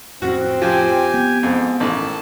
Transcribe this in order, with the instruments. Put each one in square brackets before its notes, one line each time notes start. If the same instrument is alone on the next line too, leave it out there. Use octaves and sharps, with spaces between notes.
[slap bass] F2 A2 [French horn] C4 [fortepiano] F#4
[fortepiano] F3 [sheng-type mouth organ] G4 G#5
[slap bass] B3
[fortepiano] F2 [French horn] G#2
[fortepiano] A1 [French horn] D#3 [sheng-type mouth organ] A5